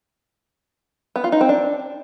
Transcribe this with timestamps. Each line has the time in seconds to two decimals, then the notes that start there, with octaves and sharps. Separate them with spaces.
1.16 B3
1.24 F4
1.32 D#4
1.41 C4
1.49 D4